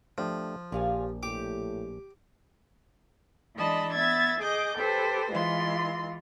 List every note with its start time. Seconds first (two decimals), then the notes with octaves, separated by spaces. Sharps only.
0.18 F3 A3 D4 G4
0.72 A#1 A#2 G4 D5 F5 G#5
1.23 A2 G4 D6
3.55 E3 G#3 D4 D#5 A5 B5
3.92 B3 E5 G#6 A6
4.41 G#4 D#5 D6 G6
4.75 G4 A4 B4 C5
5.30 E3 G#3 F4 C6